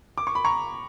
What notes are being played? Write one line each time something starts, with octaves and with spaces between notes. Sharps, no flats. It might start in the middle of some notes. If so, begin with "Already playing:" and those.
D6
C#6
B5
A#5 C#6